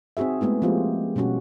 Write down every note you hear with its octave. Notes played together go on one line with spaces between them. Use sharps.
C4 D#4 F#4 G#4 E5
G#3 A3 B3 E4
F3 G#3 A#3 C4 F4 G4
B2 G3 C#4 F#4